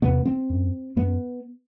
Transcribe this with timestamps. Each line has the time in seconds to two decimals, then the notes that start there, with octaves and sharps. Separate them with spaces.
0.02 E2 C3 B3
0.25 C4
0.50 F#2
0.96 F#2 B3